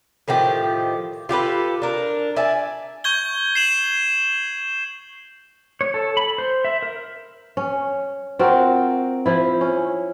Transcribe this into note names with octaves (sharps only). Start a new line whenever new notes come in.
A2 D#3 F3 G4
F4 G4 A4 B4
D4 A#4
D5 E5 G#5 A5
C#6 G6 G#6 G7
C7 E7 F#7
C#5
A4
B5
C5
E5
A#4
C#4
C4 F4 F#4 A#4
F3 E4
C#4